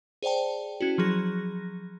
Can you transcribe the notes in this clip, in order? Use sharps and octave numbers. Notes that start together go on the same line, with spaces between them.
G#4 C5 D5 G5 A5
C#4 E4 F#4
F3 F#3 G#4 A#6